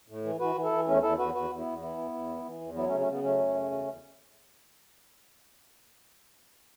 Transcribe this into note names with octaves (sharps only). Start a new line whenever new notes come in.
A2
E3
E3 F#4 B4
E3
E4 A4
E3
E2 A3 C#4
E2 E4 A4
E2 F#4 B4
E2 F#4 B4
E2
B3 E4
E2
E3 B3 E4
E2
E2
E3
E3
E2
F#3 B3 E4
A3 C#4
C#3
A3 C#4
C#3 B3
F#3 A3 C#4
F#2
C#3
E2
E2